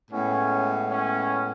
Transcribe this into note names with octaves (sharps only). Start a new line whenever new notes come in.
A2 G#3 B3 C#4
C#4